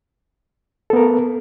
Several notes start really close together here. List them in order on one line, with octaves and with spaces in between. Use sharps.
A4 B3 A#4